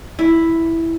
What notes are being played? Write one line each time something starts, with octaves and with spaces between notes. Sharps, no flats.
E4